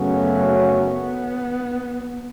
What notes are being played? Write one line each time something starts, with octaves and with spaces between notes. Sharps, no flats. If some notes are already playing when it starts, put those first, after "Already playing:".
Already playing: F#2 C#3 F#3 A3 B3 C#4
B3